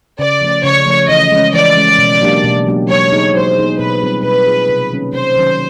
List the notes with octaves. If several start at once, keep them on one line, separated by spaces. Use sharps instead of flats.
C#3 D5
F3 A3 C#4
C#3 C#5
F3 A3 C#4
E3 D#5
G#3 C#4
E3 D5
G#3 C#4
B2
F#3 A#3 D4 G4
B2
F#3 A#3 D4 G4
F#3 C#5
B3 D#4 G#4
F#3 C5
B3 D#4 G#4
B2 B4
G3 C4 F4 G#4
B2 B4
G3 C4 F4 G#4
C3
D#3 F#3 A#3 C#4
C3 C5
D#3 F#3 A#3 C#4